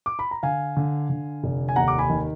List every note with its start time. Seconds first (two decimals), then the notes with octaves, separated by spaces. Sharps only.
0.06 D6
0.19 B5
0.31 A#5
0.43 D3 F5 G#5
0.77 D3
1.10 D3
1.44 F1
1.69 G#5
1.76 D#2 F#5 A#5
1.88 D6
1.98 G#5 B5
2.10 D#3